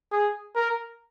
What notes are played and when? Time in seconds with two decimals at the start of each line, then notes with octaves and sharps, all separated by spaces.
0.12 G#4
0.56 A#4